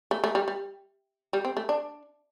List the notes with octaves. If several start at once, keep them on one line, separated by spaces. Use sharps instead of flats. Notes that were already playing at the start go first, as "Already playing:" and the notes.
A3
A3
G3
G3
G3
C4
A3
D4